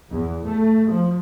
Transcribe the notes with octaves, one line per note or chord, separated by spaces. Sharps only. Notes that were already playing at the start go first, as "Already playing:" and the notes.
E2
A3
F3